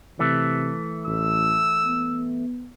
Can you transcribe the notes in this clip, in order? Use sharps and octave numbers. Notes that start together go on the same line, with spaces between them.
C3 E3 A3
A1 E6
B3